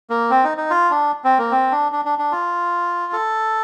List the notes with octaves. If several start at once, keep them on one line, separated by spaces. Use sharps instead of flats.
A#3
C4
D#4
D#4
F4
D4
C4
A#3
C4
D4
D4
D4
D4
F4
A4